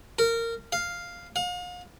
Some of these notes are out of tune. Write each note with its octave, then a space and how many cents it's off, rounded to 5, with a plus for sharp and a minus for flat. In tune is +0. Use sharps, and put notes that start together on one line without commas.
A#4 -20
F5 +0
F5 +40